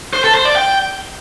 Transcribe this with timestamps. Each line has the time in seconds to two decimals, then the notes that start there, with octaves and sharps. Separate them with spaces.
0.13 C5
0.24 A4
0.35 C5
0.45 D5
0.56 G5